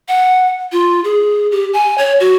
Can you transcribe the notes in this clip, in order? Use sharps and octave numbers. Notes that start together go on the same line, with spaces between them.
F#5
F4
G#4
G4
G#5
C#5
F#4